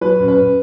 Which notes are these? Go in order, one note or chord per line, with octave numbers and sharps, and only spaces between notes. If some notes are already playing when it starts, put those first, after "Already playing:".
F#3 B4
F#2
B4
F#2